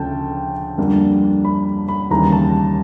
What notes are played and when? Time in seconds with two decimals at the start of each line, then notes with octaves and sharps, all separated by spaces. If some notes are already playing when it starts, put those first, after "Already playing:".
Already playing: D2 C#3 F3 A3 G5 A5
0.78 F2 D3 G3 A#3 D4
1.45 B5
1.88 B5
2.10 D#2 C#3 E3 G3 A#5
2.32 A5